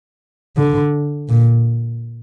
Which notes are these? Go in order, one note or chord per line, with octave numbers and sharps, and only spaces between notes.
D3
A#2